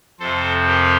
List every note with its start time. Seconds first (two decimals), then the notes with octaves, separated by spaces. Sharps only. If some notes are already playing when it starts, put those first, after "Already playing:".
0.19 F2 C3 F3 A4 C5
0.67 G4 A#4